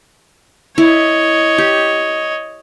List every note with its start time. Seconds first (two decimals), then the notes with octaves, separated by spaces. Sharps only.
0.78 E4 C#5 D#5
1.58 G4